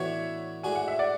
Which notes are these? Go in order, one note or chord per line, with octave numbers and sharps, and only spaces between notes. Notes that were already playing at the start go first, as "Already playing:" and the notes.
Already playing: A2 E3 B3 D4 F#4 C#5 E5
A2 G#3 D4 F#4 G#5
F#5
E5
D5 F#5